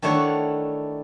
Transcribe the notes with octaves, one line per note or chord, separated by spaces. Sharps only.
D#3 A3 D4 E4 C#5 F#5